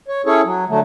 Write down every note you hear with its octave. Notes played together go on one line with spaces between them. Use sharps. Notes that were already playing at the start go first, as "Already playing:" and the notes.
C#5
C#4 E4 G#4 A4 C#5
F#3
D3 F#3 A3